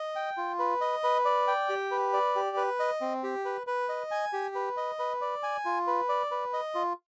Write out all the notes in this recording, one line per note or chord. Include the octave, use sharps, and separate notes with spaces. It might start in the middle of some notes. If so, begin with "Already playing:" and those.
Already playing: D#5
G5
F4
B4
D#5
B4
D5
G5
G4
B4
D5
G4
B4
D#5
C4
G4
B4
B4
D#5
G#5
G4
B4
D#5
B4
D5
G#5
F4
B4
D5
B4
D#5
F4